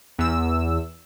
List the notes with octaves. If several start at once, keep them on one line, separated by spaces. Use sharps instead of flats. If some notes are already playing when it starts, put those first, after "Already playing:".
E2 E6